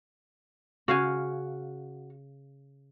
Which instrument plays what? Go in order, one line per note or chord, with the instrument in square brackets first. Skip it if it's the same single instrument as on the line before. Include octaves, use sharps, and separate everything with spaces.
[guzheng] C#3 F5 G#5 [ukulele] F#4